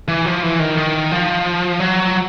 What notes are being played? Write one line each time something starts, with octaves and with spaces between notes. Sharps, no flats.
E3
F3
E3
D#3
D#3
F3
F#3